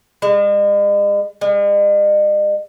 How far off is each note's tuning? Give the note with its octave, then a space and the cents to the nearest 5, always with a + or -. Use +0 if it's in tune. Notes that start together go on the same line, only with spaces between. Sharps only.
G#3 -45
G#3 -45